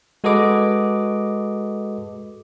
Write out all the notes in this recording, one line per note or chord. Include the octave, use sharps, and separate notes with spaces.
G#3 F#4 A4 B4 D#5 D6